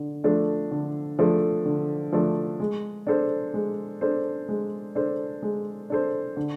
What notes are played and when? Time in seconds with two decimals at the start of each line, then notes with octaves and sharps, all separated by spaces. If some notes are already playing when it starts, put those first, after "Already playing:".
Already playing: D3
0.24 F3 A3 D4 A4
0.71 D3
1.19 F3 A3 D4 A4
1.65 D3
2.12 F3 A3 D4 A4
2.60 G#3
3.07 D4 A4 C5
3.54 G#3
4.01 D4 A4 C5
4.49 G#3
4.95 D4 A4 C5
5.42 G#3
5.90 D4 A4 C5
6.37 D3